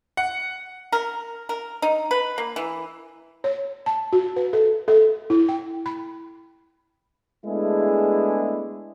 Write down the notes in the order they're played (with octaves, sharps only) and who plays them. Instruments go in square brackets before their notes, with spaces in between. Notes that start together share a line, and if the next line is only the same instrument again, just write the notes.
[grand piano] F#5
[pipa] A#4
A#4
D#4
B4
A#3
E3
[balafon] C#5
A5
F#4
B4
A4
A4
E4
G5
B5
[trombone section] G#3 A3 B3 D4 E4 G#4